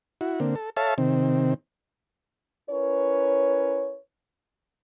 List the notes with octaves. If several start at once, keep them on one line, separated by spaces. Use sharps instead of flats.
E4 F#4
D3 A#3 C4
A4
A4 C#5 E5 F5 A5
C3 D#3 C4
C#4 E4 A#4 B4 C#5